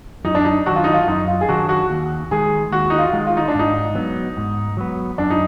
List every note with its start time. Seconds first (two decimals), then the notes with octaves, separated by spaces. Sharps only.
0.25 F#2 D#4
0.35 D4
0.44 D#4
0.66 D#3 F#3 D4 F#4
0.76 F4
0.84 D#4
0.94 F4
1.07 F#2 D#4
1.28 F4
1.41 G#4
1.49 D#3 F#3 D4 F#4
1.69 F#4
1.90 D#2
2.31 D#3 G#3 G#4
2.72 D#2 F#4
2.90 D#4
2.99 F4
3.13 D#3 G#3
3.27 F4
3.37 D#4
3.48 D4
3.54 G#2 D#4
3.95 F#3 B3
4.37 G#2
4.77 F#3 B3
5.18 F#2 D4
5.30 D#4